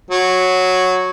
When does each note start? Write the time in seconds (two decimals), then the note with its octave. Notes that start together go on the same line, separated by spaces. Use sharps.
0.11 F#3